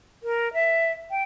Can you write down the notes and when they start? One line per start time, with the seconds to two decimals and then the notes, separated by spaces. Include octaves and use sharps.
0.23 A#4
0.53 E5
1.11 G5